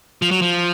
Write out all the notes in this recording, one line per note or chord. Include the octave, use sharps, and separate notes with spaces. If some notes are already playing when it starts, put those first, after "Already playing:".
F3
F#3
F3